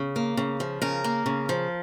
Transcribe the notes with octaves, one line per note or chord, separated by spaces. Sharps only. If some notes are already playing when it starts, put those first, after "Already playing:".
Already playing: C#3
A#3
C#3
F3
C#3 A#4
A#3
C#3
F3